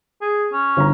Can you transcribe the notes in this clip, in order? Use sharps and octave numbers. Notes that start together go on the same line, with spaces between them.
G#4
C#4
G1 A#5